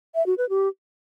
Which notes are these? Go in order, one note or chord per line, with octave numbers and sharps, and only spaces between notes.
E5
F#4
B4
G4